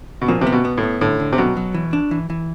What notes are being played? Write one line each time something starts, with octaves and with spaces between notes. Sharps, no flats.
B2
A#2 F3
C3
B3
B2
B3
A2
B3
A2 D3
D3
C3
B2 F#3
F#3
E3
D4
E3
E3